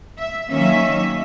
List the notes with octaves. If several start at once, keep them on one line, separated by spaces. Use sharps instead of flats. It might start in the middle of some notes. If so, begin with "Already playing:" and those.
E5
D#3 F#3 A#3 C#4 E5